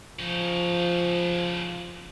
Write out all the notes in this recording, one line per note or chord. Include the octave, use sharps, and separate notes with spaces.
C#3 F3 D#4